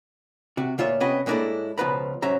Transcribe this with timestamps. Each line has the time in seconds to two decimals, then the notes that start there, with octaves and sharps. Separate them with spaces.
0.57 C3 F#4
0.78 D2 A#2 F4 C#5 E5
1.00 C2 C3 B3 C#4 D#5 B5
1.26 A2 G#3 A#3 D4 E4 A4
1.78 C#2 B2 F3 B4 A#5 B5
2.22 C2 G#2 F#3 C#4 E5 A#5